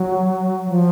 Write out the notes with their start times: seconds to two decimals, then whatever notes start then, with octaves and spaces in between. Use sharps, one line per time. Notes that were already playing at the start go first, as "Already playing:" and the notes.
Already playing: F#3
0.69 F3